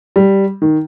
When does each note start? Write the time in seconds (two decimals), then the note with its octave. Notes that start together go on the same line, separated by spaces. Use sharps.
0.16 G3
0.62 D#3